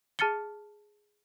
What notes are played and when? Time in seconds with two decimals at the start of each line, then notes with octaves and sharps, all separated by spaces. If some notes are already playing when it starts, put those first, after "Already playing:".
0.19 G#4 A5 F6 A6 C#7 G7